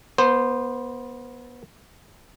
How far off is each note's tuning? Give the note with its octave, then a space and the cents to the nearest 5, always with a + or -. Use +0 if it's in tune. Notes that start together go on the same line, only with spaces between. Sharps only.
B3 -25 C5 +0